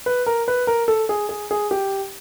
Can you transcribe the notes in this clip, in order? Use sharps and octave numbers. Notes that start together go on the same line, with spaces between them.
B4
A#4
B4
A#4
A4
G#4
G#4
G#4
G4